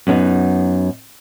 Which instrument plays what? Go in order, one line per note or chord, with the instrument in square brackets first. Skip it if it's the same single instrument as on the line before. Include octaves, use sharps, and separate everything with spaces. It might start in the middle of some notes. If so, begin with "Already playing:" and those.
[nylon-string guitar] F#2 B3 C#4 D#4